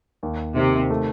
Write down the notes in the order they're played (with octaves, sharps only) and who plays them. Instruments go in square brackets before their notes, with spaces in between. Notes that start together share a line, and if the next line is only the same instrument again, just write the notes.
[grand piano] D#2
[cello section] C3 [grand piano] D#3
[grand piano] A3